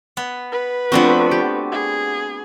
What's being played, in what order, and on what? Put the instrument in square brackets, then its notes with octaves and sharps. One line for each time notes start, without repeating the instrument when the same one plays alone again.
[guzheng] B3
[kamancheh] B4
[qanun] F3 A3 C4 [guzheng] B3 D4 F#4
[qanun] G4
[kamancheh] G#4